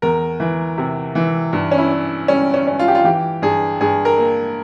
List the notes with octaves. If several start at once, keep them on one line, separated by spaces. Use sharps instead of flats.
E2 A#4
E3
C3
E3
G2
C#4
E4
C#4
G3 C#4
C#4
C#4
F4
G4
F4
E3 G4
G2 G#4
G2 G#4
A#4
A#3